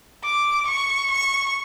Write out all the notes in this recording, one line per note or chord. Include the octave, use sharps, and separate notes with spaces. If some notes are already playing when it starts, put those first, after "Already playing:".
D6
C#6
C#6